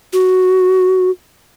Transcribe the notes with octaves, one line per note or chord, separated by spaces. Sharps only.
F#4